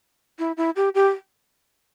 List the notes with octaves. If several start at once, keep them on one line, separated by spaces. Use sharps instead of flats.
E4
E4
G4
G4